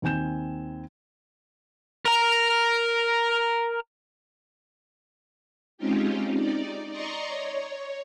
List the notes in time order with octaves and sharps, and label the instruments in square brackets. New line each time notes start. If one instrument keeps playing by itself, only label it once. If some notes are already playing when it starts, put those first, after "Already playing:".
[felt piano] D#2 D#3 C4 G#5 G6 E7
[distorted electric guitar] A#4 A#5
[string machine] G#3 C4 C#4 D#4 F4 G4
D#4 D5
D5 D#5 A#5 C6 C#6
C#5